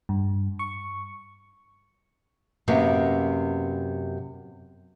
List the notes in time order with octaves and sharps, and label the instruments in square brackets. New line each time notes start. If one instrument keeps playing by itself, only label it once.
[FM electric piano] G2
C#6
[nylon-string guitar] F#2 C3 A#3 B3